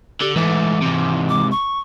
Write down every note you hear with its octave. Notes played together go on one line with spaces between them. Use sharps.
D3 G4
G#2 E3 A3 D6
G#2 C3
D6
C#6